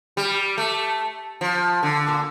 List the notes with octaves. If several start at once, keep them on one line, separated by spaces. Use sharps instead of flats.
G3
A3
F3
D3
A#2